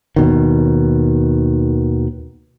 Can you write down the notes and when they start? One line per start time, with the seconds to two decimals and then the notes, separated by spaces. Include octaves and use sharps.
0.16 D#2 B2 D#3